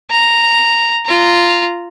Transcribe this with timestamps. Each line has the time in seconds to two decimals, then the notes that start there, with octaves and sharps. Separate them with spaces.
0.11 A#5
1.06 F4 A#5